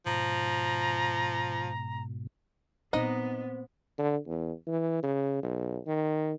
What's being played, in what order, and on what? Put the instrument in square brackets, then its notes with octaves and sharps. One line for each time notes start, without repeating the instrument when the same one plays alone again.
[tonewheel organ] G#2 B2 [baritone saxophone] F3 [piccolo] A#5
[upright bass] A#2 F#3 [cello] B3 [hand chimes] C4 C5 [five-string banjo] D#4 D#5
[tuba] D3
E2
E3
C#3
B1
D#3